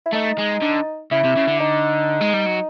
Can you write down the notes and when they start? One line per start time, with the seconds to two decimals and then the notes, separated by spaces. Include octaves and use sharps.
0.06 E4
0.13 A3 D#4
0.39 G#3
0.62 D3
1.11 C#3 E4
1.24 C3
1.37 C#3
1.48 D3
1.61 D#4
2.21 G#3
2.34 G3
2.46 F#3